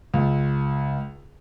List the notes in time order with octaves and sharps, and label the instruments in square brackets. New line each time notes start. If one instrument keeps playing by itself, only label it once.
[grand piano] C#2